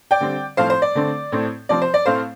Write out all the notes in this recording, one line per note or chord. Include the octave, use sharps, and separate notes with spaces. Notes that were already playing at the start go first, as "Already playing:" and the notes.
D5 G5
D3 G3 C4
A2 F3 A3 C4 C5 F5
C5
D5
D3 A3 C4
A2 A3 C4
C3 F3 C4 D5
C5
D5
A2 A3 C4 C5 F5